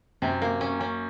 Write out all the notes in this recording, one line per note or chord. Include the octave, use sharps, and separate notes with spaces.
F#2 C3
A#3
C#4
C#4